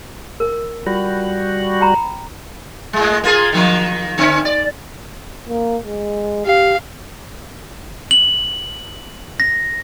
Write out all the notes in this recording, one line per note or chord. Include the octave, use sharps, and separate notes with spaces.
A#4
G3 F4 F#4
G5 A#5 B5
A2 G#3
A#3 F4 G#4
D#3 F3 A#3
D3 C4 C#4
D5
A#3
G#3
G4 F5
F#7
A#6